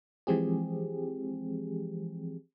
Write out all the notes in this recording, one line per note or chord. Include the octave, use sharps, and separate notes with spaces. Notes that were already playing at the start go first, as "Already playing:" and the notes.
E3 F3 G#3 C4 G4 G#4